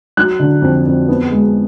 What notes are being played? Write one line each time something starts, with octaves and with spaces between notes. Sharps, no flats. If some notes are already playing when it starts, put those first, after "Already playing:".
F#3 F#6
D3
F2
F2
B3
G#3